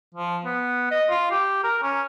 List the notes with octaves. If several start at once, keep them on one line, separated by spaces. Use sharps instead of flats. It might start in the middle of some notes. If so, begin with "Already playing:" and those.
F3
B3
D#5
F4
G4
A#4
C#4